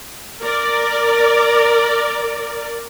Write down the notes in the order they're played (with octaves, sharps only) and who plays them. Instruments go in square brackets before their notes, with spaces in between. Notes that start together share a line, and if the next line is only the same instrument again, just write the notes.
[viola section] A#4 D5